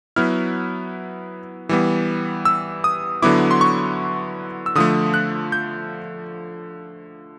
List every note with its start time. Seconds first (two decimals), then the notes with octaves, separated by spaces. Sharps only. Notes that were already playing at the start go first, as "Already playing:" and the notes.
0.16 F#3 B3 E4 F6
1.69 E3 G3 B3
2.45 E6
2.84 D#6
3.22 D3 F#3 B3 E4 D6
3.51 C6
3.61 C#6
4.66 E6
4.75 D3 F3 A3 D#6
5.14 F#6
5.52 G6